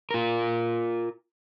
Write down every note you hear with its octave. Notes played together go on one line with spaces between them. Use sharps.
F4 A#4